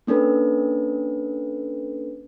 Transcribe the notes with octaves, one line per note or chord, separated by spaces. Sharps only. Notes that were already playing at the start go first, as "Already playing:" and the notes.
A#3 C#4 D4 A4 B4